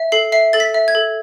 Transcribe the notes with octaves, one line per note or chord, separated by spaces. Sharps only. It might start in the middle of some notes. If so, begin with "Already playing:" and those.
Already playing: E5
A4 C7
E5 C7
A4 A6
B6
E5
G#6
A4